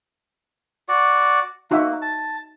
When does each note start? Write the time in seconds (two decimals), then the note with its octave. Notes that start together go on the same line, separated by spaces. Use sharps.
0.89 F#4 D5
1.71 A#3 D#4 F#4 E5
2.02 A5